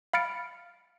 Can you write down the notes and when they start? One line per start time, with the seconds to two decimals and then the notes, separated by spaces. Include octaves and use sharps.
0.13 F5 B5 F6 A6 C#7 D7